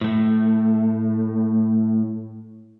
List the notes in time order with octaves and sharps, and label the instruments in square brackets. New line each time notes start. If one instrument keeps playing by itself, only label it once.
[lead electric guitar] A2 A3